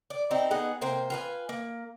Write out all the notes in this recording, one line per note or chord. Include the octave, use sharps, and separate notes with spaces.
D5
C4 D#4 E4 G4
B3 D#4 G#4 F#5
C3 A#3 C5 G5
F4 B4 G#5
A#3